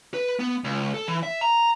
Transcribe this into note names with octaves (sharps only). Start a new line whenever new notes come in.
B4
B3
C#2
A4
E3
E5
A#5